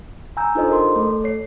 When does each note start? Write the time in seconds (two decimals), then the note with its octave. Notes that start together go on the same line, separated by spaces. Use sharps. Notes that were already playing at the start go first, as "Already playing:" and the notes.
0.37 G#5 A#5 E6 G6
0.55 D4 D#4 F4 A4 C5 D#5
0.70 G#4 A#4 C6
0.96 A3 A4
1.24 C#5 C7